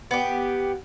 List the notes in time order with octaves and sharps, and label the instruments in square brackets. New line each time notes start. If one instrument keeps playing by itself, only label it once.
[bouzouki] B3 G4